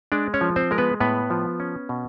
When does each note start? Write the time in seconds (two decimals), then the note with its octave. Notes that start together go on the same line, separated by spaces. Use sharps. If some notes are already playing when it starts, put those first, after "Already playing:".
0.12 G#3 D4 D5
0.34 C#4 C#5
0.41 F3
0.56 C4 C5
0.71 G#3 A#4
0.78 B3 B4
1.00 A2 B3 B4
1.30 F3
1.60 C#4
1.89 B2